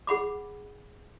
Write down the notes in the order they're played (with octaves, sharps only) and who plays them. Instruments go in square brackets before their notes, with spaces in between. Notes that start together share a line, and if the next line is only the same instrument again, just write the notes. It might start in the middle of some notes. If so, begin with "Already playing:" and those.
[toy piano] G#4 F#5 B5 D6